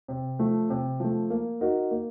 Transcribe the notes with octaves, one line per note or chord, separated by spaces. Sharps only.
C3
F3 A3
C3
F3 A3
A#3
D#4 F#4 A#4
A#3